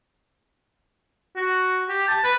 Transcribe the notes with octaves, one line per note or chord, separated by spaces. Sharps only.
F#4
G4
A5
B4